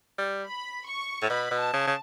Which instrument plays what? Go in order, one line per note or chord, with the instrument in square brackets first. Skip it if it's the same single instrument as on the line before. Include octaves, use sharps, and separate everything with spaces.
[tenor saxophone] G3
[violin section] B5
C#6
[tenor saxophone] A2
[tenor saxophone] B2 [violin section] B5
[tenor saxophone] B2
[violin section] A5
[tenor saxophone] C#3
C#3